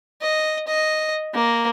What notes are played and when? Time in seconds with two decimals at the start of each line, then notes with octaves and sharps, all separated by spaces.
0.22 D#5
0.68 D#5
1.34 A#3